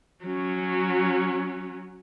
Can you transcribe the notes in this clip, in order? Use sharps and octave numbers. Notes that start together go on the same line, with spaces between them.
F#3 C#4